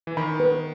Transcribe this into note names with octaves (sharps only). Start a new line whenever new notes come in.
E3
D#3 B5
B4